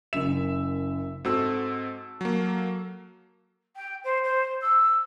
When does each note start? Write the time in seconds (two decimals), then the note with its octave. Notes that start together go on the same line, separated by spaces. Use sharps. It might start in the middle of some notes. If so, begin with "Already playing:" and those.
0.13 F#1 F#2 E5 E7
1.24 G#2 C4 F#4 A4 E6
2.21 F#3 A#3
3.76 G5
4.04 C5
4.23 C5
4.61 E6